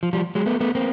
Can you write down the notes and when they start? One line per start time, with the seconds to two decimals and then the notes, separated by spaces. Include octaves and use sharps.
0.03 F3
0.13 F3 G3
0.35 F#3 G#3
0.46 A3 B3
0.60 A3 B3
0.75 A#3 C4